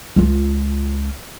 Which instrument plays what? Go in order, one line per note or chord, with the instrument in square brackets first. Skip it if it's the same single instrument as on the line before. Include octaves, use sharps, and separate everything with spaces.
[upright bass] C#2 F4